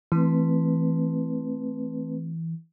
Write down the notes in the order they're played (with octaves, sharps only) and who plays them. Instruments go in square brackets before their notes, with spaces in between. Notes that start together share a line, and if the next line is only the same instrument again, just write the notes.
[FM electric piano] E3 [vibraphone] A3 C4 B4